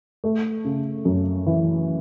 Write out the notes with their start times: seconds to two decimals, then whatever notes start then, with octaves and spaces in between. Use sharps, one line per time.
0.24 A3
0.65 C#3
1.05 F#2
1.46 E3